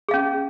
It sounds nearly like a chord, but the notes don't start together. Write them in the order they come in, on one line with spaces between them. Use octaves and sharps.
G#4 F5 C#4